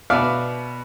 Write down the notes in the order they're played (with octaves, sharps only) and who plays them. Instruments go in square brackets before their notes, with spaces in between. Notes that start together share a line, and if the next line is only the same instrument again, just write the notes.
[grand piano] B2 B3 [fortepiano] D5 E5 F5